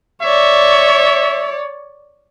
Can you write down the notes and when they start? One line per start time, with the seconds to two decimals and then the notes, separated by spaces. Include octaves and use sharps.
0.22 C#5 D5 E5